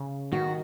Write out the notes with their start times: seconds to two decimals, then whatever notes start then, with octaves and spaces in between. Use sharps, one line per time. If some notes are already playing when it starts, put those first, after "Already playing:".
Already playing: C#3
0.32 D#3 F#4